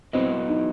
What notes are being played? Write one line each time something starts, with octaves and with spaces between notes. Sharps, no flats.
F#3 B3 C4 E4 B4 D#5
D#4